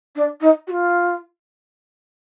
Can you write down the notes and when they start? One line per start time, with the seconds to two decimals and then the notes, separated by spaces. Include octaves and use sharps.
0.16 D4
0.41 D#4
0.67 F#4
0.71 F4